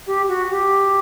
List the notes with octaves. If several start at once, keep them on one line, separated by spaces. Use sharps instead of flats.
G4
F#4
G4